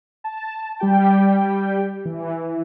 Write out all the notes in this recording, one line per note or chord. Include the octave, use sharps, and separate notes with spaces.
A5
G3 G4 G5
E3